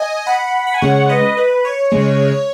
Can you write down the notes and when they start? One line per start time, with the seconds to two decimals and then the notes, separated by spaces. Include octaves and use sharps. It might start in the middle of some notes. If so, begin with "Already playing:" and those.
Already playing: D#5 G#5
0.26 F#5 B5
0.67 B5
0.74 G#5
0.81 C#3 G#3 C#5 F#5
1.09 B4 D#5
1.37 B4
1.65 C#5
1.92 C#3 G#3